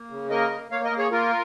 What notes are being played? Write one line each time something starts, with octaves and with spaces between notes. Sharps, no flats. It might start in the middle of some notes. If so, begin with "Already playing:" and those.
Already playing: A#3
C#3
A#3 A#4 D#5
A#3
A#3 C#5 F5
A#4 D#5
A#3
G#4 C#5
A#3 F4 A#4